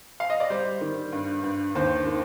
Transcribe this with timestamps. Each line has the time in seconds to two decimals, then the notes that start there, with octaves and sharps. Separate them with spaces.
0.20 F5
0.30 D#5
0.40 D5
0.50 G3 C5
0.81 D#3
1.12 G2
1.43 G2
1.75 D#2 C5
2.06 D#3